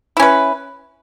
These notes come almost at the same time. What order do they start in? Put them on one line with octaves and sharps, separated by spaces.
E4 C#4 B4